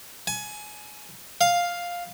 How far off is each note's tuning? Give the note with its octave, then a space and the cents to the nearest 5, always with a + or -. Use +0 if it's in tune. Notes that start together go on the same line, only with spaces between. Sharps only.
G#5 +25
F5 +5